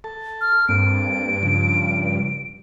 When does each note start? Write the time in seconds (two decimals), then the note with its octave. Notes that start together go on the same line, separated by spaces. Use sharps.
0.04 A4 A5
0.41 F6
0.69 G2 A#3 C4 A4 D7
1.43 C#3 F3